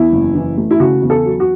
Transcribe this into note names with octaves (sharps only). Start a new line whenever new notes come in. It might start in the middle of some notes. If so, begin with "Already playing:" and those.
Already playing: E2 E4
F#1
E3
A3
E4
C#3 F#4
E2
A4
F#3
F#4